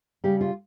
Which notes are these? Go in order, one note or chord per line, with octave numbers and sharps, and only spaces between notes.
C#3 G3 G4
F4